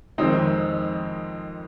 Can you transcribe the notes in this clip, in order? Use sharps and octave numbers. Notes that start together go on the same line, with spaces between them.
F2 D#3 G#3 C4 D#4